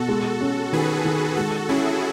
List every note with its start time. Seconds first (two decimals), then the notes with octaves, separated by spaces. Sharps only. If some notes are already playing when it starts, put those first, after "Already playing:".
Already playing: B2 F#4 A4
0.08 G#3
0.41 C#4
0.73 D#3 G#4 B4
1.05 D#3
1.37 G#3 F#4 A4
1.69 C#4 E4 G#4